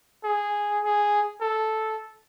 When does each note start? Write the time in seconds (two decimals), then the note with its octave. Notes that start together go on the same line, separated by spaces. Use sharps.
0.24 G#4
0.85 G#4
1.41 A4